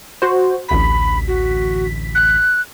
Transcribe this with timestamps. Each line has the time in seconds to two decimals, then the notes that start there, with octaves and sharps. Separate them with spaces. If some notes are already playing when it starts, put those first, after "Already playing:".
0.22 F#4 C5
0.69 A1 D2 B5 B6
1.28 F#4
2.15 F#6